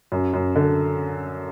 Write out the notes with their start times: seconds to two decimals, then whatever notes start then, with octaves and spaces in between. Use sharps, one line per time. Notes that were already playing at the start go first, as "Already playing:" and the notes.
0.12 F#2
0.34 F#2
0.56 D3